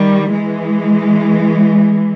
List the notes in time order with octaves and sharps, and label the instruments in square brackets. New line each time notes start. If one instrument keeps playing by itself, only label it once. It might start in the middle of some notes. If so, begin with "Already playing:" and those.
Already playing: [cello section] D#3 G3
E3 G#3